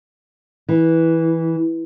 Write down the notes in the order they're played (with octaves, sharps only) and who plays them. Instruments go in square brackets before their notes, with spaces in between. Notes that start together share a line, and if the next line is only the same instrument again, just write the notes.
[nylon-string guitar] E3